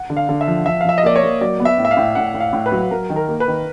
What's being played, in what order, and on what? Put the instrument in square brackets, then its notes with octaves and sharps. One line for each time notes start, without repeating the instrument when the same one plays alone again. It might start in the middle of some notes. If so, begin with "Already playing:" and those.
Already playing: [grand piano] F#5
[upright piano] D3
[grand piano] F5
[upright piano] D3
[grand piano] E5
[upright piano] F3
[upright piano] F3 [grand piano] E5
[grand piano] F5
[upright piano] F3 [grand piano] E5
[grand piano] D#5
[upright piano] A#3 [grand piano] D5
[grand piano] C#5
[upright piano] A#3
[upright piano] F#3 [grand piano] D5
[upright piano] B3
[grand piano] E5
[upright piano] A2
[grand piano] E5
F5
[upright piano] A2
[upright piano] A2 [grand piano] F#5
[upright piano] A2
[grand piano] F5
[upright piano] A2
[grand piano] B4
[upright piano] F#3
[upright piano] F#3 [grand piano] A#4
[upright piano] D#3
[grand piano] A#4
[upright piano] A#3
[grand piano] B4
[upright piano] D#3